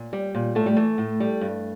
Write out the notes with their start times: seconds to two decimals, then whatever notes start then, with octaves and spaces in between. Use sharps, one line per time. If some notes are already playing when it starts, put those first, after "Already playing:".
Already playing: A#2
0.13 G3
0.35 A#2
0.55 A2 A3
0.66 G3
0.77 E3 A3
0.98 A2
1.20 G3
1.41 G2